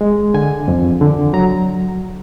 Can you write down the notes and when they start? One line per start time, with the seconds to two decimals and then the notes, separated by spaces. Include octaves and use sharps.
0.01 G#3
0.34 D3 G#5
0.68 F2
1.01 D3
1.33 F#3 A#5